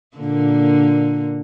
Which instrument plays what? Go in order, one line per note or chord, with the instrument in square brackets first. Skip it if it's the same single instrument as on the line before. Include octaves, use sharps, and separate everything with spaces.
[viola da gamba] A#2 D3 A#3